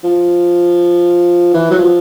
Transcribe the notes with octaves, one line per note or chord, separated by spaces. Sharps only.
F3
E3
F#3
F3